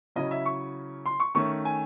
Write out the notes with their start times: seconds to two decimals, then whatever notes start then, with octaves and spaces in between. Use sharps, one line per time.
0.16 C#3 F#3 C#4 E4 D#5
0.31 E5
0.46 C#6
1.06 C6
1.20 C#6
1.35 D#3 A3 C#4 C#6
1.65 G#5